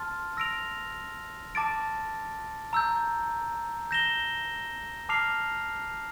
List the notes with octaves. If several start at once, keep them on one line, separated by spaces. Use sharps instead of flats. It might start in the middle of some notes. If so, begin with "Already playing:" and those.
Already playing: A5 C6 F6 A6
E6 A#6 D7 F7
A5 D6 A6 D7
A#5 E6 G6
G6 A#6 E7 G7
A5 D6 F6 C7 F7